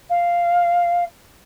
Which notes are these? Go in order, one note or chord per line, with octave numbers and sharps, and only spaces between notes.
F5